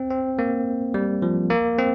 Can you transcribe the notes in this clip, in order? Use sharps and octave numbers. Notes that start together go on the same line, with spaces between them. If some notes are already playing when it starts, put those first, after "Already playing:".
Already playing: C4
C4
A#3
G3
F3
A#3
C4